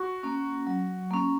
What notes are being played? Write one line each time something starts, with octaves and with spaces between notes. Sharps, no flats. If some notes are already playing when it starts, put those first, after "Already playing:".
Already playing: F#4
A#3 C#4
F#3
A#3 C#4